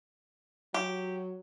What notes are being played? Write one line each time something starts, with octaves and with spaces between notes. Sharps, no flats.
F#3 G4